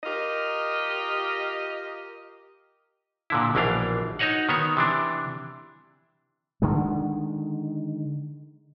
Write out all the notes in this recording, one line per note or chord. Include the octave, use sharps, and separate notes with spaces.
F4 G4 A#4 D#5
A#2 D3 E4
A#1 B2 E3 D4 F5
D#4 F#4 C#5 D#5 F#5
D#3 B3 C#5
C3 E3 D4
D3 D#3 G#3